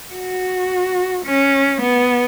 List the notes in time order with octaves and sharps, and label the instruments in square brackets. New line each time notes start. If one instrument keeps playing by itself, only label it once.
[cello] F#4
C#4
B3